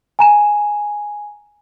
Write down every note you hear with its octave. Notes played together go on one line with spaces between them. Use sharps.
G#5 A#5 E7